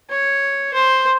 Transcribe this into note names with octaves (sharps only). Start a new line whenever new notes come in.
C#5
C5